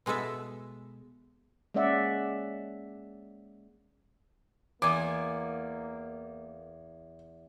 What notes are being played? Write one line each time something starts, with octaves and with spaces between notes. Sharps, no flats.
B2 G#3 B3 A4 E5
G#3 A#3 C#4 D5 E5 F#5
E2 A#3 G#5 D6